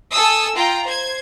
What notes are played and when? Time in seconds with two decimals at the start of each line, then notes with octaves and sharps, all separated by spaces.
0.13 A4 G#5 D#6 E6
0.57 F4 G5 A#5
0.87 C5 G#6